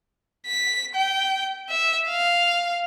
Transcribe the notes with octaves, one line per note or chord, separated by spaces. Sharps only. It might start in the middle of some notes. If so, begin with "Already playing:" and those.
B6
G5
E5
F5